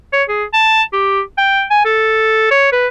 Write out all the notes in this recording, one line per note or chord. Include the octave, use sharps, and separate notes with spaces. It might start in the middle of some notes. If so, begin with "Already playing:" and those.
C#5
G#4
A5
G4
G5
G#5
A4
C#5
B4